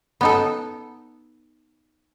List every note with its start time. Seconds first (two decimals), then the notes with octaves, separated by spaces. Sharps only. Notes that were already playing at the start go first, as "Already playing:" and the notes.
0.21 B3 D#4 A4